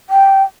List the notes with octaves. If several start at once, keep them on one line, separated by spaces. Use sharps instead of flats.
G5